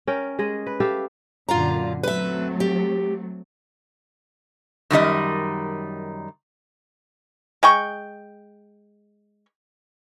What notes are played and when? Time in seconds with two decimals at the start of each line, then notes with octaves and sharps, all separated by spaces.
0.07 C#4 A#4 G5
0.39 G#3 G#4 D#5
0.67 B4
0.80 G4 A4 E5 F5
1.49 F#2 A#2 D3 F4 F5 A#5
2.03 F#3 A3 C4 B4 E5
2.60 G4
4.90 F#2 D#3 G3 D#5
7.63 G#3 G5 C#6